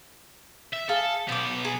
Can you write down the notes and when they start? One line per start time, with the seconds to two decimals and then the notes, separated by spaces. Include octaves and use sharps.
0.73 E5
0.89 G#4 A4 F5
1.29 B1 B3 C5 D6
1.65 G#4